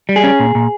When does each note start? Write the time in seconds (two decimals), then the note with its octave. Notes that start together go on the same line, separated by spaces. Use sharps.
0.09 G3
0.16 G#4
0.24 C#4
0.40 A#2
0.55 A#2